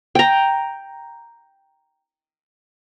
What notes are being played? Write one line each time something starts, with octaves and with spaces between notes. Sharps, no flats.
G5 A#5